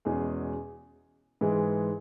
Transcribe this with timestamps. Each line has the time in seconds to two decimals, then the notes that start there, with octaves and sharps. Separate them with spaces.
0.05 E2 B2 G#3 C#4 G#4
1.41 G#2 E3 G#3